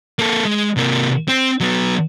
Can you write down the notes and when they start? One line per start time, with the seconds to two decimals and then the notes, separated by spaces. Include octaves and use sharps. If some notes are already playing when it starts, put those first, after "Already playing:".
0.19 A#3 A4
0.45 G#3
0.77 C3 A#3
1.28 C4
1.60 F#3 B3